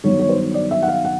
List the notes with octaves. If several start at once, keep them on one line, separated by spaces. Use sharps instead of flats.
G2 D#3 F#3 B3 C#5
C#5
C5
D5
E5
F#5
F5
F#5